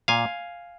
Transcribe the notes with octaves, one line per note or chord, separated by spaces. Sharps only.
A#2 F5 G#5